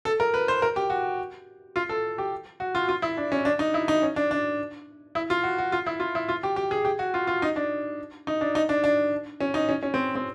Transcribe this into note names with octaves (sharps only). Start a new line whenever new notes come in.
A4
A#4
B4
C5
A#4
G4
F#4
F4
A4
G4
F#4
F4
F4
E4
D4
C#4
D4
D#4
E4
D#4
C#4
D4
D4
E4
F4
F#4
F#4
F4
E4
F4
E4
F4
G4
G4
G#4
G4
F#4
F4
F4
D#4
D4
D#4
D4
D#4
D4
D4
C#4
D#4
C#4
C#4
C4
C4